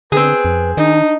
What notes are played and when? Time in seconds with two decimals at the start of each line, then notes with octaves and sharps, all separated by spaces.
0.12 D3 C4 G#4 B4
0.45 F2
0.77 D#3 D4 D#4